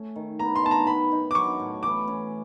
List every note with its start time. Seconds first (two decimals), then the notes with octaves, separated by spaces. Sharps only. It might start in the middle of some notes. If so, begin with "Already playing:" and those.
Already playing: A3 C#4
0.16 D#3
0.39 B3 A#5
0.56 C6
0.63 D#3 A5
0.71 A#5
0.87 B3 B5
1.12 D#4
1.31 D6
1.35 F#3 C#6
1.60 A2
1.83 E3 D6
2.08 C#4